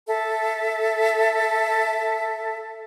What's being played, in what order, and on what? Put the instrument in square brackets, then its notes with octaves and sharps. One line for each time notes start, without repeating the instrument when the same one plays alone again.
[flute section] A4 E5